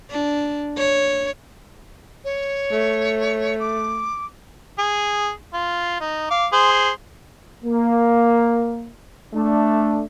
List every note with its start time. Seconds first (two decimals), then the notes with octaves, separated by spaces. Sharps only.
0.10 D4
0.77 C#5
2.24 C#5
2.72 A3
3.59 D6
4.78 G#4
5.53 F4
6.00 D#4
6.31 F5 D6
6.52 G#4 C5
7.64 A#3
9.34 A3 D4